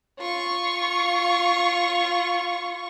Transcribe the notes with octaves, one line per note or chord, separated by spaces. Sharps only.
F4 C#6